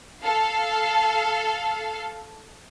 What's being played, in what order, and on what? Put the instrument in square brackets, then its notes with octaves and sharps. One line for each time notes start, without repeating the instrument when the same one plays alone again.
[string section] A4 F5